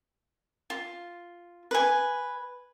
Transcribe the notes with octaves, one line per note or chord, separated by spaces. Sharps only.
F4
B4 G#5